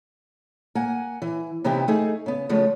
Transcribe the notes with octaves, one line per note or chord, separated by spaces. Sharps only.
A#3 F#5 G#5
E3
C3 E3 B3 D#4 E4 G4
A3 D#4 G#4
C#3 B3
C#3 F3 G#3 A3 B3